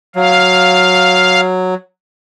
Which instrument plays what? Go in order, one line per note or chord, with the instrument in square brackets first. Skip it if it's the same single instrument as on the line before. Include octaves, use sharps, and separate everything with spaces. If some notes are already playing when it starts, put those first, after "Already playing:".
[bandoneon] F#3 [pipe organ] F5